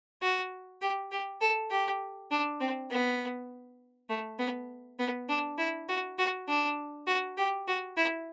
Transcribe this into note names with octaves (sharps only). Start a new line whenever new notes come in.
F#4
G4
G4
A4
G4
D4
C4
B3
A3
B3
B3
D4
E4
F#4
F#4
D4
F#4
G4
F#4
E4